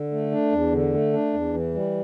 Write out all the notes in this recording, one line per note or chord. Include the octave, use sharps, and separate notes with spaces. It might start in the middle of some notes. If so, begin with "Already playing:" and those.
Already playing: D3
A3
D4
E2
D3
A3
D4
E2
E3
G3